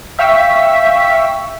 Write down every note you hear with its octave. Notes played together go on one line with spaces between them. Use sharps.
E5 F5 G5 C#6 E6 B6